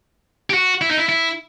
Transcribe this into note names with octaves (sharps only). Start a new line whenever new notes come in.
G4
F#4
E4
D#4
E4
E4